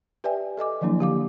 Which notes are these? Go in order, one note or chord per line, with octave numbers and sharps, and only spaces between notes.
G4 B4 D5 E5 G5 G#5
A4 D#5 G#5 D6
D#3 F3 F#3 A#3 D4 E4
D3 G4 F5 D6